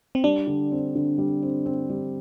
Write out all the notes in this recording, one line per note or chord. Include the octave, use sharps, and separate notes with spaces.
C4
G3 D4
D3
C4
D3
G3
C4
C4
G3